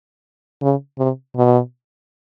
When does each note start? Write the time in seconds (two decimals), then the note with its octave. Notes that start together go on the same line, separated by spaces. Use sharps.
0.62 C#3
0.98 C3
1.36 B2